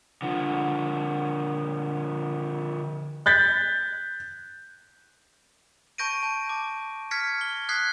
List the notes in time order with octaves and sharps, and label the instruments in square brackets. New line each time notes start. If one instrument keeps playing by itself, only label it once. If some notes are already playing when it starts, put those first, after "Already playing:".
[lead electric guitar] D3 F3
[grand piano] F#6 G6 A6 B6
[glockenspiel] A5 C#6 G6 A#6 D7 D#7
A5 D7
A5 D6
F6 G#6 A#6 B6 C#7
G7
D#6 F#6 G#6 B6 C7